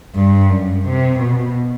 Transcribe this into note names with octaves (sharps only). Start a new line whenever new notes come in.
G2
F#2
C3
B2